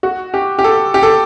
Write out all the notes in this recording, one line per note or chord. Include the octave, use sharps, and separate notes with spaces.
F#4
G4
G4
A4
G4
A4